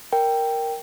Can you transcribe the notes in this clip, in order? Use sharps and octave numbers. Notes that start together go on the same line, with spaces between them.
A#4 G5